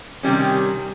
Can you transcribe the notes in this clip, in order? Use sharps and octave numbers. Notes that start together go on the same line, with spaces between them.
C3 D#3 G3 C#4